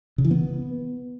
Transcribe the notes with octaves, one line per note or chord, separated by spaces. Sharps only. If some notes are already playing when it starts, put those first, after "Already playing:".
C#3
E3
B3